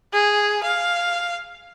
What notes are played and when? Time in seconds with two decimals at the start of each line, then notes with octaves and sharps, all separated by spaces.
0.13 G#4
0.63 F5